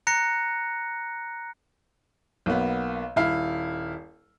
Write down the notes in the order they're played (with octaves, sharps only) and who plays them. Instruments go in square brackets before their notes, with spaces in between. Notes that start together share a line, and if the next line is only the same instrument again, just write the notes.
[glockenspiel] A#5 F#6 A#6 C#7
[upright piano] B1 A#3 B3
D#1 E4 F5